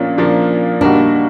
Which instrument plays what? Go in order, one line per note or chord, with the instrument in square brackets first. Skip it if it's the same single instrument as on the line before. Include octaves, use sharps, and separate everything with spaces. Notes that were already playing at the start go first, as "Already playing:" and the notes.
Already playing: [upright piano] A#2 F3 A#3 D4 F4 [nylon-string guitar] C#4
[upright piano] A#2 F3 A#3 D4 F4
[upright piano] A#2 G3 A#3 D#4 F#4 [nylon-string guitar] D4